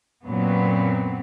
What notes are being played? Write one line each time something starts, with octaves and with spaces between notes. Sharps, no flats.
F#2 A#2 F#3 B3 C4